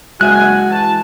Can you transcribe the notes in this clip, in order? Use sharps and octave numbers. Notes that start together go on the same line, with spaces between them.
F#1 G#3 F#4 E5 G#5 F#6
E3 A5